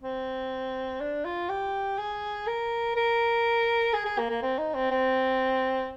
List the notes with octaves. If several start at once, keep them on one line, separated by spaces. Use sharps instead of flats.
C4
D4
F4
G4
G#4
A#4
A#4
G#4
G#4
A#3
A#3
C4
D#4
C4
C4